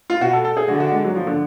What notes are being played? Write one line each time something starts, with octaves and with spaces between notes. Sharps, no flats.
F4
B2 F#4
A4
A4
G#4
D3 F#4
F#4
G#3
F#3
F3
D3